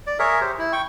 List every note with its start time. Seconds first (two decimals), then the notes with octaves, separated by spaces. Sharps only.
0.07 D5
0.19 G#4 A#4 C#5 E5
0.41 G4 C5
0.59 E4
0.73 G5 C#6